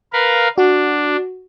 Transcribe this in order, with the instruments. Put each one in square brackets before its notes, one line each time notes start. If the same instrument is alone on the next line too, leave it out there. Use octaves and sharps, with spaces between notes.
[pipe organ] A#4 B4 F5
[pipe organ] D4 [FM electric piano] F#4